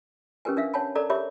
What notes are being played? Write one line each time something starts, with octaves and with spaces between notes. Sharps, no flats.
C#4 G4 A#4 B4 G#5
D4 A#4 E5 F5
C#5 F#5 G#5 A5 B5
A4 A#4 D5 A#5 D6
G4 A#4 C#5 E5 B5 D6